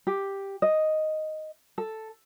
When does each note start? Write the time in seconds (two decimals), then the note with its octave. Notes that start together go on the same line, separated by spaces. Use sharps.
0.07 G4
0.62 D#5
1.78 A4